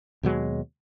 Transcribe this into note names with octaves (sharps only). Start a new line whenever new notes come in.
D#2 B2 F#3 G#3